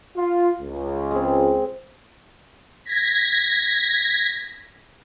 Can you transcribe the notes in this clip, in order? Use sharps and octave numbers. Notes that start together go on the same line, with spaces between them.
F4
C#2
G#3 C4
G#6 A#6 B6